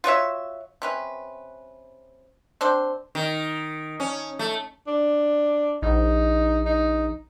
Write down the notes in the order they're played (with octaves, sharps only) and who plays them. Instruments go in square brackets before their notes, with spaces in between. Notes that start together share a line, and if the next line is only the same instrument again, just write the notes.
[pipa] F4 F#4 C#5 E5
C3 C#4 B4
C4 D4 C5
[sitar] D#3
C#4
A3
[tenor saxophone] D4
[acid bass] A#1 [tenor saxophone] D#4
[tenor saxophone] D#4